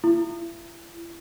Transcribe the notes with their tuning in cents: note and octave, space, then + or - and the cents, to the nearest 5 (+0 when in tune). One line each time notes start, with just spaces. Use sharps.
E4 +35